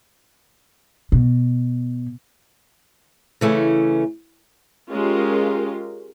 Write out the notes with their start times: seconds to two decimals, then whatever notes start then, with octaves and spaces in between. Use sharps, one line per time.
1.12 B2
3.41 C#3 E3 A3 C#4
4.91 G#3 C#4 F4 G4 A#4